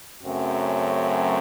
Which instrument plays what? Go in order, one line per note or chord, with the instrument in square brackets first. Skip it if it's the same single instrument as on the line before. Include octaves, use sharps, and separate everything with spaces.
[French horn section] F#2 C#3 F#3 A3 C4